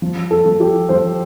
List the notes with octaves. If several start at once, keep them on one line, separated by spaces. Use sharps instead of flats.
F3
A4
F3
G4
F3 C5